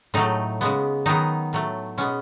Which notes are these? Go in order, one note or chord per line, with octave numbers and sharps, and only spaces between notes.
A2 F#3 A3 D#4
C#3 G#3 B3
D#3 F#3 B3 D#4
A2 F#3 A3
B2 G#3 B3 C#4